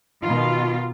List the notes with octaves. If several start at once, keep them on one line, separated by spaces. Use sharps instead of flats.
B2 D#3 F4